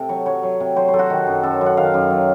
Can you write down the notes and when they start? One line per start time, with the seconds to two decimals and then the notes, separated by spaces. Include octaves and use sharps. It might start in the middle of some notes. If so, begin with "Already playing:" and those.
Already playing: C3 A4
0.09 F#3 C#5
0.26 F#3 C#5
0.43 F#3
0.60 C3
0.76 F#3 C5
0.88 C5
0.93 F#3 A4
0.99 F#4
1.10 D#3
1.27 F#2
1.43 F#2 A4
1.61 F#2
1.66 F#5
1.77 D#3 F5
1.94 F#2
2.10 F#3